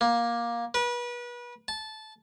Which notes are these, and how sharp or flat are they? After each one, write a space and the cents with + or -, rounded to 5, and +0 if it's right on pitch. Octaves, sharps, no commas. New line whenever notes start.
A#3 +15
B4 -30
A5 -15